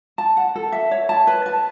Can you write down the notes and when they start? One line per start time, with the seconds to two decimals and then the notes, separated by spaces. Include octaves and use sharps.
0.18 A5
0.37 F#5
0.56 A4
0.72 E5
0.91 C#5
1.09 A5
1.27 B4
1.46 A5